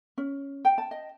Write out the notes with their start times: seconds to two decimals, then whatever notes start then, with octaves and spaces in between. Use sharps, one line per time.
0.18 C#4
0.65 G5
0.78 A5
0.91 D#5